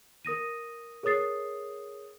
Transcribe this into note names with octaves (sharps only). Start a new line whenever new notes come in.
A#4 D#6 A#6 D#7
G#4 A#4 C#5 D#6 A6 C7